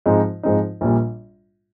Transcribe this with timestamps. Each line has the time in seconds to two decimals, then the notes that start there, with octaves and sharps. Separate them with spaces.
0.06 G#2 F3 G#3 C4 D#4
0.43 G#2 F3 G#3 C4 D#4
0.81 A#1 A#2 G3